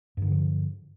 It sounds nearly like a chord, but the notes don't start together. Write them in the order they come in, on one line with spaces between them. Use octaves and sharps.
G2 D#3 D3 F3